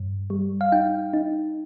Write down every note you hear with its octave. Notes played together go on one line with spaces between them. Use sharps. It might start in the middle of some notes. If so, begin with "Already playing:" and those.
Already playing: G2
G3
F5
D#4 G5
D#4